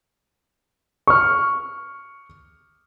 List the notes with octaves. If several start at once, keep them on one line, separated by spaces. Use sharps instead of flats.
C#6 F6